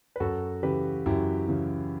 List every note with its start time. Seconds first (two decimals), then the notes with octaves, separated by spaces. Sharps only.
0.16 B4
0.20 F#2 F#4 A4
0.63 C#3 E3 G4 B4
1.06 F#2 E4 G4
1.48 C#3 E3